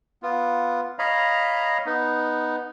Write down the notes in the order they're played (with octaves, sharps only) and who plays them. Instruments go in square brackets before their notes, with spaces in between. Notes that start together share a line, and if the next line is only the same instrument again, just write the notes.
[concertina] B3 F4
C#5 D#5 F5 A#5 B5
B3 D#4